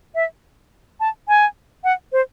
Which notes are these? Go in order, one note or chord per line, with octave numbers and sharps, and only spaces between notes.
E5
A5
G#5
F#5
C5